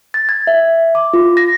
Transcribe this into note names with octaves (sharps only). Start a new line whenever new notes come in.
A6
G#6
E5
D6
F4
A#6